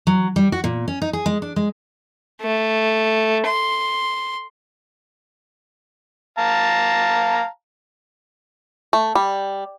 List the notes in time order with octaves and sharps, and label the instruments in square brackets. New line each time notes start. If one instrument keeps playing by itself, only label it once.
[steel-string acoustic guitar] F#3
G3
F#4
A#2
C#4
D#4
G#4
G#3
D4
G#3
[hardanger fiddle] A3
C6
[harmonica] F5 A5 A#5
[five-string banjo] A3
G3